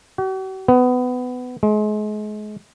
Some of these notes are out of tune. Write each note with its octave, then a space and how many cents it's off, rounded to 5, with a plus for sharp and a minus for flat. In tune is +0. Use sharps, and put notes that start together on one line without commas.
F#4 +45
B3 +20
G#3 +35